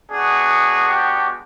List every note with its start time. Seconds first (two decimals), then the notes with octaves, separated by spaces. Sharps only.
0.11 G#3 B3 D4 F#4 G#4
0.88 G4